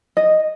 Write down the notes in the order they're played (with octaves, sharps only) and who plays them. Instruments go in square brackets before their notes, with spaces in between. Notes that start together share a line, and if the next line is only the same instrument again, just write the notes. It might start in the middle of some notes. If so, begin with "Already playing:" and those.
[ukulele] D#5